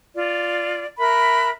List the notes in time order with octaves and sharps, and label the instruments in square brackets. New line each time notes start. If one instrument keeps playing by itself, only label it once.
[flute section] F4 D5
A#4 E5 B5 F#6